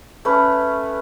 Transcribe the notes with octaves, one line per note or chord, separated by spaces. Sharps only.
A3 C#4 B4